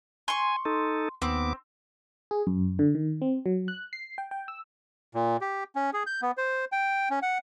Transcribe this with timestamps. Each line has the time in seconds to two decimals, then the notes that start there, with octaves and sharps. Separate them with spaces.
0.28 G#5 C6 C#6
0.65 D#4 A4
1.22 D#2 B3 C4 D6
2.31 G#4
2.47 F#2
2.79 D3
2.95 D#3
3.22 C4
3.46 F#3
3.68 F#6
3.93 C7
4.18 G5
4.31 G5
4.48 E6
5.15 A#2
5.41 G4
5.75 C#4
5.93 G#4
6.07 G6
6.22 B3
6.37 C5
6.72 G5
7.10 C#4
7.22 F#5